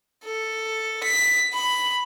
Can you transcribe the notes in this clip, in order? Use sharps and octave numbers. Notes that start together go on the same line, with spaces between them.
A4
B6
B5